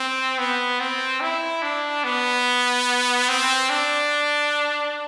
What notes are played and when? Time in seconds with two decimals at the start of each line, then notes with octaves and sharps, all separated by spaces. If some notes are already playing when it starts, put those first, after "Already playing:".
Already playing: C4
0.39 B3
0.80 C4
1.21 E4
1.62 D4
2.04 B3
3.29 C4
3.70 D4